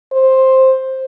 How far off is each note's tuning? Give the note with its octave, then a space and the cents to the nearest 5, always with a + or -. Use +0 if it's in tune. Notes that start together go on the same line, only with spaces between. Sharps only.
C5 +10